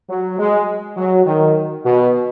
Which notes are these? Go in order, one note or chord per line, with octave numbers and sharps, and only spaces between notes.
F#3
G#3
F#3
D#3
B2